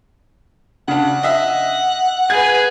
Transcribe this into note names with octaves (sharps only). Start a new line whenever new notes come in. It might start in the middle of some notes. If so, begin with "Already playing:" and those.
C#3 D4 F#5
D#5 E5
G#4 B4 G#6